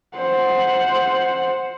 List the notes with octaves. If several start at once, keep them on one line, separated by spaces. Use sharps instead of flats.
C5 F#5